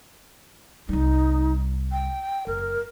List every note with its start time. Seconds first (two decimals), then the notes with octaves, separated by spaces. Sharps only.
0.89 C2 G3 D#4
1.92 G5
2.47 F#1 A#4